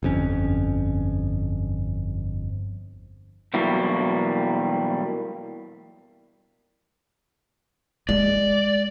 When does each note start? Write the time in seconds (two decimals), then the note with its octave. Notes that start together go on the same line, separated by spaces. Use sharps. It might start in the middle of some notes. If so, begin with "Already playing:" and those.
0.03 G1 F2 C#4
3.54 B2 E3 F#3 G3 A#3 F#4
8.09 G#3 D5